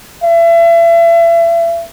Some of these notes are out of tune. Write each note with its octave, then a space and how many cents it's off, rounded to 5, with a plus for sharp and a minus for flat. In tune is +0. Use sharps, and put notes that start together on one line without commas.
E5 +35